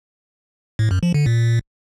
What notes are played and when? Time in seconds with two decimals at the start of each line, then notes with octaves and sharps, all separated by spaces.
0.79 A2
0.91 F#2
1.03 F3
1.14 D3
1.26 A#2